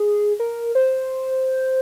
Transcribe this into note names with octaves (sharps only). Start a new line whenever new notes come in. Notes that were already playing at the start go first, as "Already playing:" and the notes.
Already playing: G#4
A#4
C5